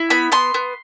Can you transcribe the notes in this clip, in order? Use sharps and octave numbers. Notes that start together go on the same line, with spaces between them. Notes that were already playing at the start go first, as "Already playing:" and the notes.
Already playing: E4
B3 B5
B3 C6
B3